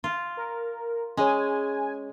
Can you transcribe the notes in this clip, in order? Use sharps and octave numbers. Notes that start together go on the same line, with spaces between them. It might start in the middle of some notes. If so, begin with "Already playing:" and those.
F4
A#4
G#3 C#4 G#4 C#5 G#5